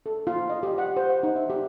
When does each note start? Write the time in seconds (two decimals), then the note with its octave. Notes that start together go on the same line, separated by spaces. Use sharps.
0.06 A4
0.27 F4
0.49 D#5
0.63 G4
0.78 F#5
0.97 C5
1.10 F#5
1.23 D#4
1.36 E5
1.50 G4